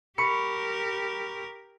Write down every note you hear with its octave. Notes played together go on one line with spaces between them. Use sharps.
G4 A#4 B5 C#6 C#7